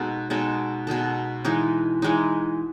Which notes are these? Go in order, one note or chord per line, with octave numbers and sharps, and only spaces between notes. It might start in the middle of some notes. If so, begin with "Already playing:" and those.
Already playing: B2 G#3 D#4 A4
B2 G#3 D#4 A4
B2 G#3 D#4 A4
E3 G#3 D#4
E3 G#3 D#4